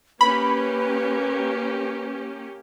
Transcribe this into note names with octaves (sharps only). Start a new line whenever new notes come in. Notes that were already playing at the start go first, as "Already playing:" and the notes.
A#3 C#4 G4 B4 B5